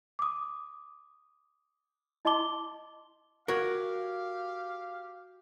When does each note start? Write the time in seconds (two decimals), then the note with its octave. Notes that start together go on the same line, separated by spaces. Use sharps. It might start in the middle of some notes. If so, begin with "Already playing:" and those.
0.19 D6 D#6
2.25 E4 D#5 A5 C6 D6 G7
3.48 F#4 G4 A#4 C#5 F5